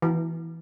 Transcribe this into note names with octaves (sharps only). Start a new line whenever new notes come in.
E3